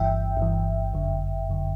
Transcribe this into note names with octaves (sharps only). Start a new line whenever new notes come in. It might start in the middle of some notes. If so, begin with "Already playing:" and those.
Already playing: G1 G2 E3 E5 G5
G1 G2 E3
G1 F#2 D3
G1 F#2 D3